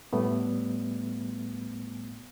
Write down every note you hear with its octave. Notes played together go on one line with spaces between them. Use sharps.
A2 G3 A3 B3